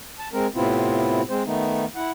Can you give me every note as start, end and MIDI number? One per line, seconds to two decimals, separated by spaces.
0.19 0.29 81
0.33 0.47 56
0.33 0.47 60
0.33 0.47 70
0.55 1.22 45
0.55 1.22 48
0.55 1.22 59
0.55 1.22 60
0.55 1.22 64
0.55 1.22 65
1.29 1.43 56
1.29 1.43 60
1.29 1.43 72
1.46 1.85 51
1.46 1.85 57
1.46 1.85 59
1.46 1.85 63
1.96 2.11 64
1.96 2.11 78